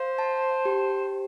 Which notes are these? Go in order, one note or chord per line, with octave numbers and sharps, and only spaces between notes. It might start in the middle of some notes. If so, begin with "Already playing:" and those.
Already playing: C5 F5
A5
G4